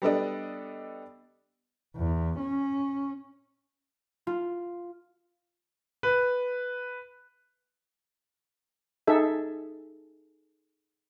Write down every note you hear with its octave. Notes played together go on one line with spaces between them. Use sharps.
G3 B3 D4 A4 D5 D#5
E2
C#4
F4
B4
D#4 G#4 A4 E5